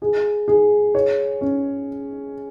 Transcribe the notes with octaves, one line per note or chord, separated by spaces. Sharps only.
G#4
G#4
C#5
C#4